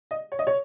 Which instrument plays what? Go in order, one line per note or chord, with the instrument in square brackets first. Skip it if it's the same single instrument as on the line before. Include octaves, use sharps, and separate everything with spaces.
[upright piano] D#5
C#5
D#5
C#5